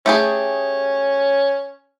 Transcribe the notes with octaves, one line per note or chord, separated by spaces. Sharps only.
A3 C#4 G4 G#4